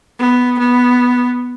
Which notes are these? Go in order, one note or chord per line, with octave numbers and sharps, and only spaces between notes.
B3
B3